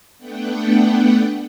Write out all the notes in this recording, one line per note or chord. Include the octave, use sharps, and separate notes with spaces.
A3 B3 D4 F#5 G5